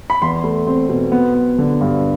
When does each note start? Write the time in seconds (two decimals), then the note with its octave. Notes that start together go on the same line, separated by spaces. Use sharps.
0.10 B5
0.22 E2 C6
0.44 A3
0.67 C4
0.89 B2
1.12 B3
1.34 B3
1.58 D3
1.81 G2